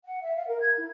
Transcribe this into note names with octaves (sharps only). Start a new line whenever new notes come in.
F#5
E5
F5
A#4
G#6
E4